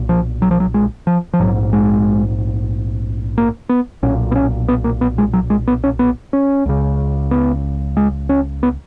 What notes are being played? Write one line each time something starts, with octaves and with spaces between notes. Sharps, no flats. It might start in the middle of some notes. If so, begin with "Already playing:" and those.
Already playing: B1 A#2
F3
F#3
F3
F#3
G#3
F3
F3
A#1 G#2 F#3
G#3
A#3
B3
B1 A#2 C#4
B3
C#4
B3
A#3
B3
G#3
F#3
G#3
B3
C#4
B3
C#4
C#2 C#3
B3
G#3
C#4
B3